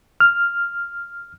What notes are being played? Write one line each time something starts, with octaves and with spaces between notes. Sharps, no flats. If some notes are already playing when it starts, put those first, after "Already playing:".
F6